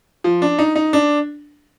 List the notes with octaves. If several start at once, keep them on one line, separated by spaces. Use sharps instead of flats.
F3
D4
D#4
D#4
D4